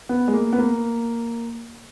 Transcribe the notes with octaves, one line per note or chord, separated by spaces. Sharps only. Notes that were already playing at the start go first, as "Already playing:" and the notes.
B3
G#3
A#3
B3
A#3